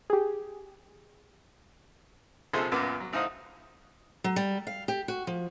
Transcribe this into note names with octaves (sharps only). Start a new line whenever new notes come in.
G4 G#4
A#1 C3 F3 G#4 A4 C6
C#2 F#2 A#2 B3 D6
F#3
A1 D#4 C5 F5 F#5 D#6
F#3
G3
F5
G4
F#4
F3